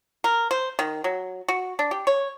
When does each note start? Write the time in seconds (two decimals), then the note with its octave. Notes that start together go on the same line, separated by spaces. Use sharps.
0.24 A#4
0.51 C5
0.79 D#3
1.04 F#3
1.48 F#4
1.79 D4
1.91 G4
2.07 C#5